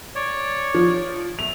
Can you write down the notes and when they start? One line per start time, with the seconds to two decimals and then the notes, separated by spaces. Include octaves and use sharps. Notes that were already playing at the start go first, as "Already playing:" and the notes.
0.15 C#5 D5
0.74 F3
1.39 A3 F7